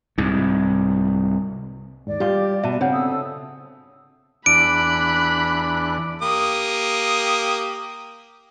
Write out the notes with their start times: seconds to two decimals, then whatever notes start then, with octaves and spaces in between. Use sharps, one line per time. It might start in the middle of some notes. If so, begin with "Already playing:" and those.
0.18 C2 G#2
2.07 D#2 G#2 D5
2.20 G3 F4 G4
2.64 B2 E5 A5
2.81 C#3 C4 D4 C#5 F#5
2.93 A4 D#6 E6
4.46 E2 D4 B5 F#6 D7
6.22 A#3 G4 D#6